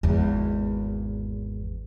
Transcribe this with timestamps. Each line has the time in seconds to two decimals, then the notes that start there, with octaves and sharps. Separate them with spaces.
0.03 G#1 E2